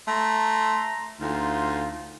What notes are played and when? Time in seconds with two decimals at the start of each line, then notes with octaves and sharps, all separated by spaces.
0.07 A3 A#5 C6
1.21 D2 D#4 F4